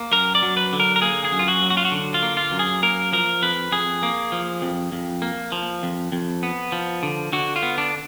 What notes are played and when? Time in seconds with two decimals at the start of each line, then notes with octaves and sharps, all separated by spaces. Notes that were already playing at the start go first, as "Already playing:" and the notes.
Already playing: A#3
0.12 F#2 A#4
0.35 D5
0.43 F#3
0.57 B4
0.73 D3
0.80 A#4
0.96 A#4
1.02 A#3 G#4
1.25 G#4
1.32 F#2
1.39 F4
1.48 F#4
1.62 F#3
1.70 F#4
1.77 F4
1.85 F#4
1.92 D3
2.14 F4
2.22 A#3
2.37 F4
2.52 F#2
2.59 G#4
2.83 A#3 A#4
3.12 F3 A#4
3.42 F2 B4
3.72 F2 G#4
4.03 A#3
4.32 F3
4.62 F2
4.92 F2
5.22 A#3
5.52 F3
5.83 F2
6.12 F2
6.43 B3
6.72 F3
7.03 D3
7.33 D3 F#4
7.56 F4
7.63 B3
7.78 D4